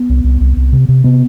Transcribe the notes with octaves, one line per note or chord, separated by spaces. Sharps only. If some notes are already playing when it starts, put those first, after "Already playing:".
Already playing: B3
C2
C2
C2
C2
C3
C3
C3 B3